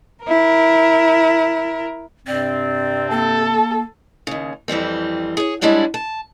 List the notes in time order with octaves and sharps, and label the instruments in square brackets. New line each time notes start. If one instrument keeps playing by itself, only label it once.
[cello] E4 A#4
[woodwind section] G2 C3 C4 [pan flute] D5
[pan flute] A#3 [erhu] A4
[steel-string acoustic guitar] D#2 C#3
F2 E3 G3 C4
G#4 C#5
G3 G#3 D4 E4 C#5 F#5
A5